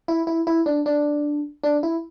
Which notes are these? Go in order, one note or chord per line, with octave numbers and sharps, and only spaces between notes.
E4
E4
E4
D4
D4
D4
E4